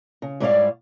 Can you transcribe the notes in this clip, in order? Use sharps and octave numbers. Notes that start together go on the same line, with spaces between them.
C#3
G#2 G3 E4 C#5 D5 F5